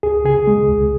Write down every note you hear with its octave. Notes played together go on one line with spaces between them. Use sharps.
C#2 G#4
C#3 G#4
G#3
C#2